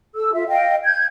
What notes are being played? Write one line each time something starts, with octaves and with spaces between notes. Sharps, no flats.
A4 E6
F4 E5
D#5 F5 G5
G6 G#6